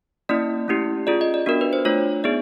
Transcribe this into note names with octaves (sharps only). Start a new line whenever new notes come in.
A#3 C#4 E4 D5
A3 C#4 E4 G4
C#4 F4 G#4 D5
D#5
D5
B3 D4 F#4 A#4
B4
C5
A3 D4 F4 C#5
B3 D#4 G#4 D5